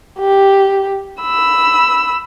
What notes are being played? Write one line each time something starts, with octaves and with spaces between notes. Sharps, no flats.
G4
B5 E6